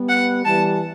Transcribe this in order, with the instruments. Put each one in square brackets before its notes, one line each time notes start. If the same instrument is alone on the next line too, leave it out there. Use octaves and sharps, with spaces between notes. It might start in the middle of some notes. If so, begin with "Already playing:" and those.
Already playing: [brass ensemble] G3 B3
[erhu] F#5
[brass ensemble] E3 G3 [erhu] A5